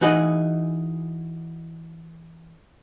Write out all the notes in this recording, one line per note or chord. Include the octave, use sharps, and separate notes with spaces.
E3 D#4 F#4 G#4 D#5